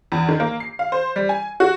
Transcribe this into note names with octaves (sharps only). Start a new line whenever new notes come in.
E2
D#3
A#3
C7
F5
C5
G3
G#5
F#4